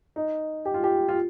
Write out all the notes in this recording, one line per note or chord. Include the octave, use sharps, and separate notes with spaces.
D#4
G4
F4
G4
F4